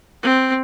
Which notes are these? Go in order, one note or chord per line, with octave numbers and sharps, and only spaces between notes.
C4